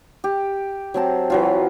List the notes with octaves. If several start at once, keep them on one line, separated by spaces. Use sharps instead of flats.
G4
F#3 C4 A5
E3 F#3 F4